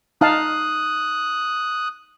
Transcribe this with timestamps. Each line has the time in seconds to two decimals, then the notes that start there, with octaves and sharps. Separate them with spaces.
0.21 D#4 F5 A5 D#6 F#6